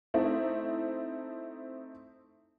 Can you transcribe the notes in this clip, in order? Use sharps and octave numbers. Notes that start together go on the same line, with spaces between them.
A3 C4 D#4 E4